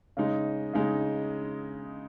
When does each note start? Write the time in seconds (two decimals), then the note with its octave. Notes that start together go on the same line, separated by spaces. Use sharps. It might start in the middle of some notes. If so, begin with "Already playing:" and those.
0.17 C#3 G#3 D#4
0.73 C#3 G#3 D#4